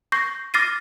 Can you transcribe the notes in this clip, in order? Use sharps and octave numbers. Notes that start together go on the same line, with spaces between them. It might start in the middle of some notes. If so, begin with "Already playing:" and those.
C#6 G6 A#6 C7
D6 F6 A6 A#6 C7 D#7